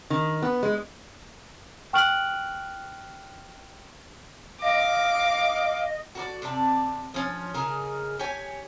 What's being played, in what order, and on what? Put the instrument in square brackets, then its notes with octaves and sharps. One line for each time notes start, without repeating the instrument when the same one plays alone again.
[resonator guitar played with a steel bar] D#3
B3
G#3
[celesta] G5 C#6 F6 F#6 D7 F#7
[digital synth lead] D#5 [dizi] F5 [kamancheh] D6
[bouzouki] F#4 A#4 D5
C3 C4 D5 A5
F3 C#4
C#3 D#4 G#4 A#4
G4 C#5 G#5